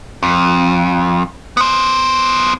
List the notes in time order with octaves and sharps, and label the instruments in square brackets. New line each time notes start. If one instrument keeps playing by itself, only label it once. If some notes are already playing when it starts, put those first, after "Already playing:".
[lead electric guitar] F2
B3 C5